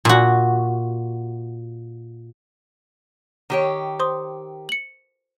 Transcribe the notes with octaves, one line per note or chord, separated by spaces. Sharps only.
A#2 F#4
D#3 G4 C#5
C5 C6 D#6
C#7 F#7